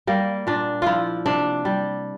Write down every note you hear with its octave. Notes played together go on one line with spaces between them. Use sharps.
G3 A#3
A#2 D4
F3 E4 F4
C3 D4
G3